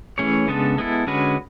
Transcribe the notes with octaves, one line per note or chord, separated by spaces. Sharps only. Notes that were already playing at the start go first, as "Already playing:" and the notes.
E3 A3 C#4 G#4 C#5
C#3 G#3 B3 D4 A4
G#3 B3 E4 A4
D3 G#3 C#4 F#4 B4